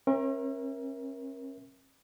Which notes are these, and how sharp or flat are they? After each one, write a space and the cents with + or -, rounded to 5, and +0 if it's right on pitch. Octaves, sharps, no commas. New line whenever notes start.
C#4 -40 A#4 +20 E5 -15